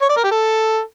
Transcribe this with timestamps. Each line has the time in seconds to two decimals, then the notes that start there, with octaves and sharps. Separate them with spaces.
0.02 C#5
0.09 D5
0.16 A#4
0.24 G4
0.31 A4